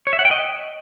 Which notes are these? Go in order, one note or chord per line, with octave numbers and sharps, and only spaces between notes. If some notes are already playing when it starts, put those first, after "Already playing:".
C#5
E5
F#5
G5
D#5